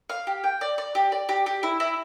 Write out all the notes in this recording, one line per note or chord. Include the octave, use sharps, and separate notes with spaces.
F5
G4
G5
D5
D5
G4
D5
G4
G4
E4
E4